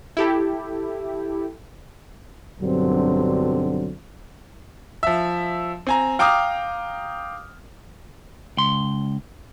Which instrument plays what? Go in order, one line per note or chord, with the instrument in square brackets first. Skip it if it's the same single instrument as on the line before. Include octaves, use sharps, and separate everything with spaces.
[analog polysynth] E4 G4 A4
[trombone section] B1 G2 D3 F#3 C4
[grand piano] F3 E5
C4 G#5 A#5
F5 G5 A#5 D6 D#6 F6
[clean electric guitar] C#2 C6